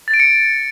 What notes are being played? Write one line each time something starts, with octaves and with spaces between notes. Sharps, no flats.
A6
D7
C#7